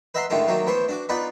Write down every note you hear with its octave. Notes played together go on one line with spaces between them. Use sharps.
B4 D#5 E5 F#5 A#5 C6
A2 D3 D#3 G#3 A3 F4
D#3 F#3 A3 A#3
E3 A3 B3 C5 C#5
D4 F#4 D6
B3 D#4 F4 B4 D5 F#5